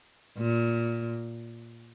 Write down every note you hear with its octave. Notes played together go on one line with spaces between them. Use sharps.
A#2